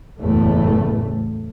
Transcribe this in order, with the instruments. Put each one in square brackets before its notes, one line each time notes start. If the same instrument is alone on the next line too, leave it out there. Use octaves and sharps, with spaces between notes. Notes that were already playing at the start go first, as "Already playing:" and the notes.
[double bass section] F#1 E2 A2 A3